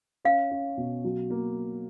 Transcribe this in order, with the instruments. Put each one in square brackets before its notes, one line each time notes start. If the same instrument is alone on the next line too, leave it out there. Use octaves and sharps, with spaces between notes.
[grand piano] C#4 [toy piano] F5
[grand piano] C#4
B2
F#3
A#3